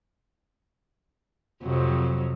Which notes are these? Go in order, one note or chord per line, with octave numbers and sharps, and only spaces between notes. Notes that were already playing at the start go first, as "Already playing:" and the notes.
F2 C3 F#3